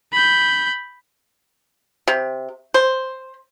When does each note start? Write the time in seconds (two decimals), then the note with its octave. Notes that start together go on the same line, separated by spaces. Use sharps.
0.13 B5 G6
2.08 C3
2.74 C5